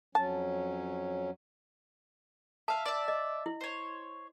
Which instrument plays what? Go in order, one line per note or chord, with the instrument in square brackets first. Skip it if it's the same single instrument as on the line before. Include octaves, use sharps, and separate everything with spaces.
[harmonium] F2 F#3 C#4 [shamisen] A5
[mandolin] E5 F5 [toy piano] A5
[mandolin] D5 E5
[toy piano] D#5
E4
[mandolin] C5 C#5